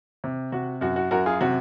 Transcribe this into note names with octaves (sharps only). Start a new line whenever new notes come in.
C3
C3 F#4
F#2 F#4
F#4
F#2 F#4 A#4
F4 G#4
C3 F#4